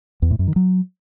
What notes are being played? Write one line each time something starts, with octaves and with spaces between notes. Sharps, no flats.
E2
A2
F#2
D#3
F#3